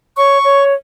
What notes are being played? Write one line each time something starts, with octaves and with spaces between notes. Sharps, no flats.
C#5 C#6
C#5